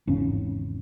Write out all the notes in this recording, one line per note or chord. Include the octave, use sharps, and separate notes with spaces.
G#1 E2 C#3 C#4